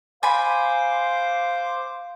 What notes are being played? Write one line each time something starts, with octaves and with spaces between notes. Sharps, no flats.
C5 F5 G#5 B5 D6